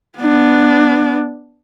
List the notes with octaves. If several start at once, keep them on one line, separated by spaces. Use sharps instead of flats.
B3 D4